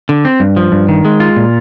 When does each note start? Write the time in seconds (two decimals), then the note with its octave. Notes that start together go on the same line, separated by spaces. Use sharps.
0.09 D3
0.25 C4
0.40 G2
0.56 F3
0.72 G2
0.89 D#3
1.05 G#3
1.20 F4
1.36 A#2